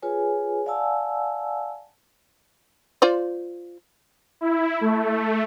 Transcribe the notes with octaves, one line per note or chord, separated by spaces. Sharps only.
F4 G#4 B4 C#5 G#5
D5 F5 F#5 G#5 A5 E6
F4 C5 D5
E4
A3